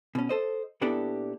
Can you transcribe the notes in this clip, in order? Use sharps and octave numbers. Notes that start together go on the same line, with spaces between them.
B2 C#4
A4 C5 D#5
A#2 B3 D4 E4 G4 A4